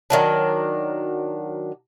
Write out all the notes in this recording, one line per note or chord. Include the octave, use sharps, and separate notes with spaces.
D#3 F#3 D4